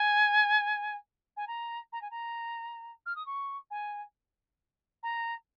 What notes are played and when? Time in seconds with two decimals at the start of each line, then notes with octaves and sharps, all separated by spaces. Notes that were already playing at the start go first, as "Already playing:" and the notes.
Already playing: G#5
1.37 G#5
1.48 A#5
1.93 A#5
2.02 G#5
2.11 A#5
3.06 F6
3.16 D#6
3.26 C#6
3.71 G#5
5.03 A#5